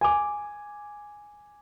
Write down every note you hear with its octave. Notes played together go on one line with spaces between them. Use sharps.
G#5 D6